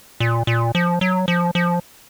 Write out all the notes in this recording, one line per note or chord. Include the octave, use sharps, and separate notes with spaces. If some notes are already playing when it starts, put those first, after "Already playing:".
A#2
A#2
F3
F#3
F3
F3